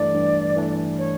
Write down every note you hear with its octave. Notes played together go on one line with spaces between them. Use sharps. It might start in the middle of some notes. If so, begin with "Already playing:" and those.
Already playing: G2 E3 A3 D4 D5
G2
E3 A3 D4
C#5